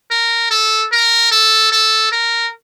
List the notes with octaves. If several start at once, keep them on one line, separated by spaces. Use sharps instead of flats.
A#4
A4
A#4
A4
A4
A#4